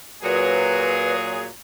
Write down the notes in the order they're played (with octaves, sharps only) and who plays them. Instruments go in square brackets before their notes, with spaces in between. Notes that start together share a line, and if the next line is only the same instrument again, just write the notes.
[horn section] A#2 F#3 G#4 [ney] B4